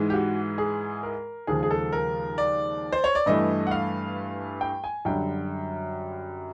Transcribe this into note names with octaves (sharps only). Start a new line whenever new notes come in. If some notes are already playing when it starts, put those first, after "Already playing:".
Already playing: G#2 E3 G#3
G4
F#4
G#4
A#4
D#2 C#3 F3 G#3 G#4
G#4
A4
A#4
D5
C5
C#5
D5
G2 E3 A3 D#5
F#5
F5
G5
G#5
F#2 D3 G3 G5